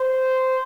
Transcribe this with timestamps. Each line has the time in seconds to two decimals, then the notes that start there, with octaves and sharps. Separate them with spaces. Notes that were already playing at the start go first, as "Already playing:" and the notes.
Already playing: C5